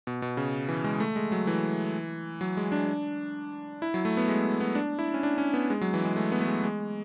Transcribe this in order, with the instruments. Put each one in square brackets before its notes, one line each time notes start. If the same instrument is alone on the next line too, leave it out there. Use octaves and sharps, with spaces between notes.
[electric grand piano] B2
B2
C#3
E3
G#3
A3
G#3
F#3
E3
F#3
G#3
D4
E4
F#3
A3
B3
G#3
B3
D4
E4
C#4
D4
C#4
B3
G#3
F#3
E3
G#3
A3
B3
A3
G#3
G#3